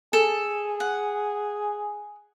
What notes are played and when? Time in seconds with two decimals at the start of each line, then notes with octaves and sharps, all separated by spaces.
0.13 G#4 A4
0.80 F#5